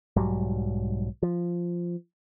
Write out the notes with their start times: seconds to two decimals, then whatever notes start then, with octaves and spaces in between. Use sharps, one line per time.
0.16 B1 G#2 F#3 G3
1.23 F3